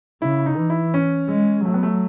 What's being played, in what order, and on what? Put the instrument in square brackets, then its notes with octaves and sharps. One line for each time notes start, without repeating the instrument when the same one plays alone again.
[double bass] C#3 [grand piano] E4
[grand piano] D#4
[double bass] E3
[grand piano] E4
C#4
[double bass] G#3
[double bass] F#3 [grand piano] A3
[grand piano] B3
A3